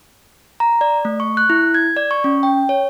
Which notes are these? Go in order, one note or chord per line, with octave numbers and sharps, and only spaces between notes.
A#5
D5
A3
C#6
F#6
E4
G#6
D5
C#6
C#4
G5
C#5